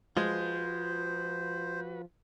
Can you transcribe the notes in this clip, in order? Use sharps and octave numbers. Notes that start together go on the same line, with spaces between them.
F3 G#3 F4 F#4 B4 C5